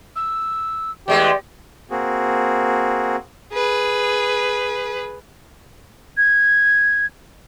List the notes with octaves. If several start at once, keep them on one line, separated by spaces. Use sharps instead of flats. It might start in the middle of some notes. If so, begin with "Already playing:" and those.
E6
E2 G#3 A3 G4 D5
A#3 C4 F#4 G#4
G#4 B4
G#6